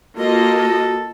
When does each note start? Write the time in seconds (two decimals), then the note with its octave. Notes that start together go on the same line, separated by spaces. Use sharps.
0.17 A#3 F4 F#4 A4 D#5